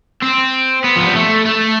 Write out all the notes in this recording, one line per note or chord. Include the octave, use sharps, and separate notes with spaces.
C4
B3
F3
G3
A3
A3